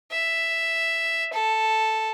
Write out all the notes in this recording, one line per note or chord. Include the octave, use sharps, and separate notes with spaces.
E5
A4